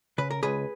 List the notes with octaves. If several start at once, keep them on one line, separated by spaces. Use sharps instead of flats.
C#3 B4
A#4
C#2 G#4 B4